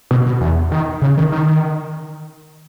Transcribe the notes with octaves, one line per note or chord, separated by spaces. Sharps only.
B2
B2
E2
D#3
C#3
D#3
D#3